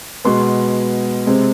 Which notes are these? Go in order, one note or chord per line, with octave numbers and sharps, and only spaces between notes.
B2 G#3 B3 C6
C3 G#3 C4